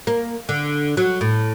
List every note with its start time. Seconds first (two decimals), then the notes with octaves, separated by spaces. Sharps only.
0.07 A#3
0.49 D3
0.97 F#3
1.21 A2